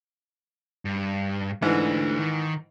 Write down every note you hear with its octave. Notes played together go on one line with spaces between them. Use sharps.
G2
G#2 E3 A3 D4
D#3